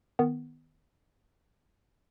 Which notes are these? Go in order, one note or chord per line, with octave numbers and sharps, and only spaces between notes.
D#3 B3